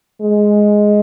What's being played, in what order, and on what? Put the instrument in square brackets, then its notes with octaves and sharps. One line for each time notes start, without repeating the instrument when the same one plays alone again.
[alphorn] G#3